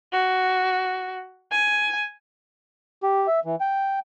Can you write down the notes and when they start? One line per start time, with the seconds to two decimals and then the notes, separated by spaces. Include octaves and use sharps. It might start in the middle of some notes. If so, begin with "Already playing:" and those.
0.12 F#4
1.51 G#5
3.03 G4
3.27 E5
3.45 E3
3.60 G5